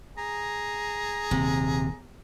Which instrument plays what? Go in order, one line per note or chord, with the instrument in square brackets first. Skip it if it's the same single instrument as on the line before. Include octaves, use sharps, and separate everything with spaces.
[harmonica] G#4 [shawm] A#5
[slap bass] D#1 D#2 [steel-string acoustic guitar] C3